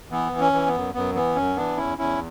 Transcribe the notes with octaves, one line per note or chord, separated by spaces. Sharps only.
E3 B3
E3
C#4
E3
B3
F#2
F#2 B3
E3 B3
F#2 C#4
E3 B3 D4
E2 C#4 E4
E2 C#4 E4